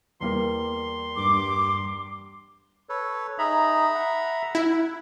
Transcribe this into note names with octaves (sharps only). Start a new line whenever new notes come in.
E2 G3 A#3 C6
G2 D6
A4 B4 C#5
D#4 G#4 E5 A#5 B5
F#5
E4